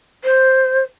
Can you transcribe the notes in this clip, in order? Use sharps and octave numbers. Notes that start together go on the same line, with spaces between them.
C5